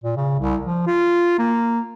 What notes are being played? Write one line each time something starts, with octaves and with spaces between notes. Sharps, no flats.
A#2
C#3
C2
F3
F4
A#3